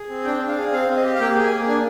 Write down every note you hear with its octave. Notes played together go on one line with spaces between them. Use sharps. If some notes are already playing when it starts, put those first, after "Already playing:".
Already playing: G#4
C4
D4 G5
D4
F5
G#4
C4 F5
C4
D#5
G4
F5
A#3 G5
G#4
G#5
A#3
D4 G#5